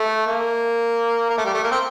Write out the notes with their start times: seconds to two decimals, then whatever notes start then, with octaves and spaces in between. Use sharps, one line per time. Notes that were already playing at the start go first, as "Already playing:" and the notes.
Already playing: A3
0.27 A#3
1.30 A#3
1.38 A3
1.45 G3
1.54 A3
1.64 A#3
1.71 C4